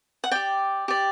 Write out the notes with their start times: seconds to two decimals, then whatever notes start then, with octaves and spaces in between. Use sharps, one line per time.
0.24 F#5
0.31 G4 D5 G5
0.88 G4 D5